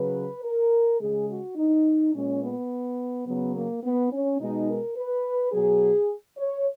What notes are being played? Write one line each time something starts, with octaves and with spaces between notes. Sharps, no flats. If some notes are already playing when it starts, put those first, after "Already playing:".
Already playing: C#3 F#3 B4
A#4
C#3 G#3 G#4
F#4
D#4
A#2 G#3 C#4
B3
C#3 F#3 B3
A#3
B3
C#4
B2 G#3 D#4
A#4
B4
B2 F#3 G#4
C#5